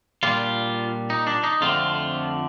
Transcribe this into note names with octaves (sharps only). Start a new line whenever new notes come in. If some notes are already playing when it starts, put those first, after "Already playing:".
A#2 G3 D4 F4
D#4
D4
D#4
F2 D3 A3 C4 F4